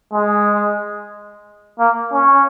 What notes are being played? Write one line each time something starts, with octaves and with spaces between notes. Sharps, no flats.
G#3
A#3
C#4